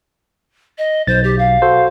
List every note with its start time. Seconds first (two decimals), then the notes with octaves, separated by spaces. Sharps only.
0.78 D#5
1.07 B1 C5 A6
1.23 G4
1.38 F5
1.62 F#4 A4 C5